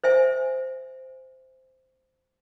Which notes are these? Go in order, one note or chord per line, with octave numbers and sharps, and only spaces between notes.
C5 E5 G#5